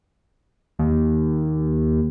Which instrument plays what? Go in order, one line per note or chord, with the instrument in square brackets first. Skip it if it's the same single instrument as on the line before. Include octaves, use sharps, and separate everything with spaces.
[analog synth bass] D#2